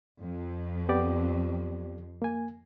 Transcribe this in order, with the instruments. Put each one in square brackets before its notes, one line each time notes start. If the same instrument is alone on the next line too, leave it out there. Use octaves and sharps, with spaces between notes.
[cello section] F2
[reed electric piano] B3 G4 D5
A#3 G#5